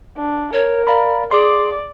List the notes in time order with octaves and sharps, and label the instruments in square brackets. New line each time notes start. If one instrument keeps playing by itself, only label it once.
[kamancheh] D4
[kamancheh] A#4 [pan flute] C#5
[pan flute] D5 [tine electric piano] F5 A#5 B5
[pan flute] G#4 [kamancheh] D5 [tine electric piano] C6 D6